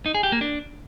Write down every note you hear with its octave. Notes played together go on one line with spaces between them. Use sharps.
D#4
G#4
G4
A#3
D4